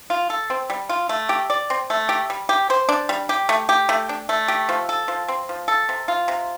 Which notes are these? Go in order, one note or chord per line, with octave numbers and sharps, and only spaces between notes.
F4
A4
C4
G3
F4
A3
G4
D5
C4
A3
G4
G3
G4
C5
D4
G3
G4
A3
G4
A3
D4
A3
G4
F3
A4
F3
C4
F3
A4
C3
F4
C3